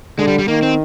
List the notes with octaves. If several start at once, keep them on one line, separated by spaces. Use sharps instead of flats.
D3 G#3
G3
G3
D#3 A#3
C4